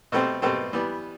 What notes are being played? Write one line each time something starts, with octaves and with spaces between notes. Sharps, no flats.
B2 A3 C4 G4 C5
B2 A3 C4 G4 C5
E3 G3 B3